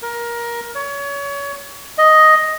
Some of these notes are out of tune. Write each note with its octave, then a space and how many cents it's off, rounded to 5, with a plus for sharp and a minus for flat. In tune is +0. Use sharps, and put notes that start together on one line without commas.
A#4 +20
C#5 +30
D#5 +5